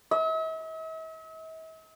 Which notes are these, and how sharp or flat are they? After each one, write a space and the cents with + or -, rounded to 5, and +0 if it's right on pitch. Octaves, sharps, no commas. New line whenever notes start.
E5 -45